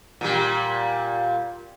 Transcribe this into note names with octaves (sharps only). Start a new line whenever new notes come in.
A#2 G3